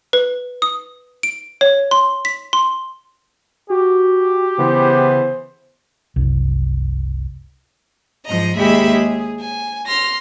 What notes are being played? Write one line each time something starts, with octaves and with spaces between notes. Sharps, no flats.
B4
D#6
D7
C#5
C6
B6
C6
F#4 G4
C#3 E3 B3 C5
F#1 C2
G#2 F3 D#5 A#5
D#2 G#3 G4 G#4 E5 B5
G#4
G#5
C6 F6 A#6